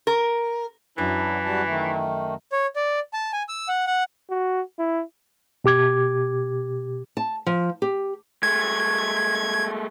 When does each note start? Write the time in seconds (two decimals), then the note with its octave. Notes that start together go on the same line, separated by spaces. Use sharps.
0.07 A#4
0.98 F#2 E3 F#3 D4 E4
1.45 G3 F#4 A5
1.67 D#3 A3
2.52 C#5
2.76 D5
3.13 A5
3.33 G#5
3.49 E6
3.68 F#5
3.87 F#5
4.30 F#4
4.79 E4
5.64 B2 G4 D6 G#6
7.17 A5
7.46 F3
7.82 G4
8.43 G#3 A3 G#6